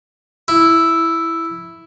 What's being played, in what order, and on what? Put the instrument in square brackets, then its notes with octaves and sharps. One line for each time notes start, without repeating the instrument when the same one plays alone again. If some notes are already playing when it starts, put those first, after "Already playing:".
[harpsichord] E4